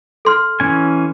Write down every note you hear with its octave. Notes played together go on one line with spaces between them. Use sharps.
A4 C6 F6
E3 C#4 G#5